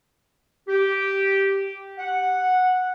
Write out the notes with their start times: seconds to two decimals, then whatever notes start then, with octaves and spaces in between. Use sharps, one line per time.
0.68 G4
1.99 F#5